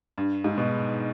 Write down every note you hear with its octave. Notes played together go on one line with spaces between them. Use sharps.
G2
G#2
B2